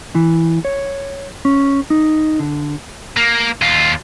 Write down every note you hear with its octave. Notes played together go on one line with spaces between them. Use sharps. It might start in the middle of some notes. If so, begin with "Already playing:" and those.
E3
C#5
C#4
D#4
D3
A#3
D#2 F4